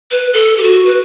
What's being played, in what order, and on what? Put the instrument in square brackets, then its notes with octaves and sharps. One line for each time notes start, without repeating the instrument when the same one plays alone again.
[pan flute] B4
A4
G4
F#4
B4